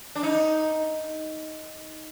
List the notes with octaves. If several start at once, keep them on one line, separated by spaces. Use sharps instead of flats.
D4
D#4